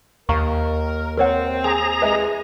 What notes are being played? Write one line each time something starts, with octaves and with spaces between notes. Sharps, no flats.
D#2 A#4 F5 A#5 C#6
C4 A#4 C#5 F#5
G#4 G#5 A#5
E3 G3 G#3 B4 D#5 E5